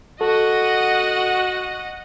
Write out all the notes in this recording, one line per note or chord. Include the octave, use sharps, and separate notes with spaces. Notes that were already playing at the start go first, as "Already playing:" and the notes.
F#4 A4 D#5 F#5